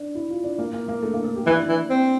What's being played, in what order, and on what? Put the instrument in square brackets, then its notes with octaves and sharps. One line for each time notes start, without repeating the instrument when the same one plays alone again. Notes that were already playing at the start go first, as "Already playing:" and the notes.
Already playing: [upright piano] D4
E4
F4
D4
A#3
A#3
A#3
A3
A#3
A4
G4
[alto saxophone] E3 [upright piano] E4
[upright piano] D4
E4
[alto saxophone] E3
C4